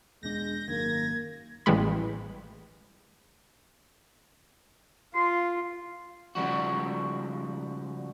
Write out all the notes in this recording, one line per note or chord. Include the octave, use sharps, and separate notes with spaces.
E1 B2 G#3 D4 G6 A#6
G#1 F#2 D#3 A#3 G#6
A1 E3 G3 G#3 B5
F4 C6
C#3 F3 G3 F#4